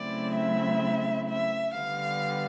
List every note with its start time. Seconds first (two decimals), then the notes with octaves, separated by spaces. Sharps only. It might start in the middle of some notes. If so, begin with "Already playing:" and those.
Already playing: C#3 F#3 A3 C4 E4 D5
0.36 E5
1.29 E5
1.75 D3 G3 B3 F5